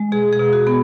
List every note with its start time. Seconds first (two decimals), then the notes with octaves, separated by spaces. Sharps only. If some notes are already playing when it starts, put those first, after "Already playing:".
Already playing: G#3
0.12 B2 G#4
0.33 G#4
0.39 B2
0.53 F#4
0.67 B3